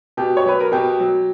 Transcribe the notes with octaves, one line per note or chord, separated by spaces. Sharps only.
B2 G4
C#5
F#3 B4
A#4
B2 G4
F#3